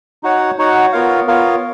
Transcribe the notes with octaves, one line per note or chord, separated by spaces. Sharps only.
D#4 F#4 C#5 F#5
D#4 F#4 C#5 F#5
B3 F4 A#4 C#5 F5
B3 F4 A#4 C#5 F5